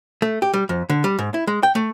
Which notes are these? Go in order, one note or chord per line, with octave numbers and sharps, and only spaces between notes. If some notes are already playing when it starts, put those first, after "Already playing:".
A3
G4
G3
F2
D3
G3
G#2
E4
G#3
G5
A3